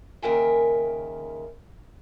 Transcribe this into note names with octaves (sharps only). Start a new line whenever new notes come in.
D#2 C#3 A#4 E5 G5 G#5